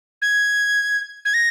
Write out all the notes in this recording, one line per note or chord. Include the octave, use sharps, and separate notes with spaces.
G#6
G#6
A#6